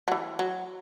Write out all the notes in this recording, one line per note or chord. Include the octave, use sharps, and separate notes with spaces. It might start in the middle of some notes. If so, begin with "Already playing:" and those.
F#3
E3
F#3